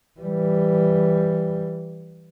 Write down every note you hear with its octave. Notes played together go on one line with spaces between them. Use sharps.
E3 G3